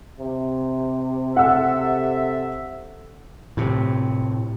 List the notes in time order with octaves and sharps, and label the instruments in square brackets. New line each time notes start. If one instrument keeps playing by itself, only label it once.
[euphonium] C3
[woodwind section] A4 E5 [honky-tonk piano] F#5 E6
[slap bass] A2 C3